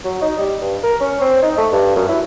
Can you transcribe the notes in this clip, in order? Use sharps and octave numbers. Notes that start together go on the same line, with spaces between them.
F#3
D#4
G3
G2
A#4
C#4
C4
D#4
A3
G2
F#2
E4